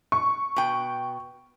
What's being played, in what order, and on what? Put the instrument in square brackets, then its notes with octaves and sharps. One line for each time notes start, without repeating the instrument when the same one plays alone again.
[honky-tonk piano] C#6
[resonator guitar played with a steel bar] B2 G5